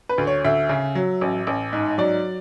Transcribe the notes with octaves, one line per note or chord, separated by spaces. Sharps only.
B4
D2
C#5
D2 E5
C#3
F#3
A1
A1
G#2
F#3 D5